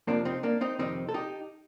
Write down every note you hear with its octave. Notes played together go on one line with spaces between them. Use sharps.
F2 C3 F3 A#3 D4
C4 D#4
A#3 D4
C4 D#4
F2 C3 D#3 C4 D#4
A4
D#4 G4